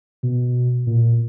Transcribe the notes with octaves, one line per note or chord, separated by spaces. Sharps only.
B2
A#2